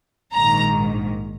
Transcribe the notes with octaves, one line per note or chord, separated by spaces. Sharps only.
A#1 G#2 D#3 A#5